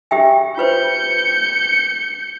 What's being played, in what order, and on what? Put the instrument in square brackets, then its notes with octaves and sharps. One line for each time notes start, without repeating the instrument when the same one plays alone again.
[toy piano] G4 E5 G5
[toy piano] F4 B4 C5 [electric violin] G6 C#7